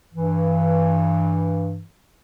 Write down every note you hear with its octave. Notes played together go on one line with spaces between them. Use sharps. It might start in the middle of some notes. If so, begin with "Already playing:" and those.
G2 E3